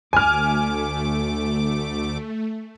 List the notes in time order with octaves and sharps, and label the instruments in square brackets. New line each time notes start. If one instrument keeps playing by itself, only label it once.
[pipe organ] D2 D6 [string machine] A3 [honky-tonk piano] G#5 F6